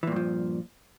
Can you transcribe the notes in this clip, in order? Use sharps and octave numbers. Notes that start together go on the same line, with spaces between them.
G2 A#2 E3 F3